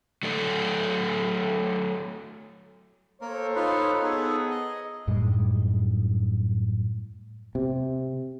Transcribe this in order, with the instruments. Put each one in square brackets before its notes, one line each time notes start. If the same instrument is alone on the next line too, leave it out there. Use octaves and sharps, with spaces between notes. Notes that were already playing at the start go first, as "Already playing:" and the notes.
[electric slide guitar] F#3 A3 A4 D5
[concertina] A#3 A#4 [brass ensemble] A4 C5 C#5
[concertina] D#4 F4 B4
[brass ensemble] B3 G#4 [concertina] D#4 A4
[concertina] D#5
[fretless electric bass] F#2 A2 G3 G#3
C3